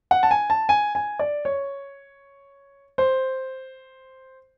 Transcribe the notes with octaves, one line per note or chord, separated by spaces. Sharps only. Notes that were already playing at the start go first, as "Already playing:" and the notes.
F#5
A5
G#5
A5
G#5
G#5
D5
C#5
C5